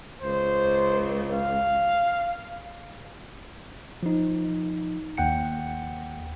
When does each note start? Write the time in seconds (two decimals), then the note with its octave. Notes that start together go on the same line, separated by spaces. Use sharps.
0.21 C#2 C5
1.33 F5
4.03 F3 D#4
5.18 D#2 F#5 G5 C#7